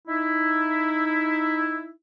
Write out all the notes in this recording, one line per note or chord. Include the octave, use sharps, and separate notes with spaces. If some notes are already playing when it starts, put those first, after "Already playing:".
D#4 E4